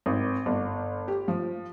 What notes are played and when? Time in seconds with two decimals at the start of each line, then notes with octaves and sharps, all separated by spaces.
0.06 G#1
0.46 G1
1.08 G4
1.28 F3